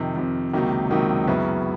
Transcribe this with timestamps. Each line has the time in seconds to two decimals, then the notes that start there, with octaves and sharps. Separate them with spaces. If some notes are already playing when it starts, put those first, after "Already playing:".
Already playing: F2 C3 D#3
0.16 F2 C3 D#3
0.53 C#2 C3 D#3 F#3 A#3
0.90 C#2 C3 D#3 F#3 A#3
1.27 F#2 C#3 F#3 B3 E4